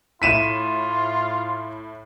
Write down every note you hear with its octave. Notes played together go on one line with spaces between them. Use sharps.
A2 E4 F4 B6 D#7 E7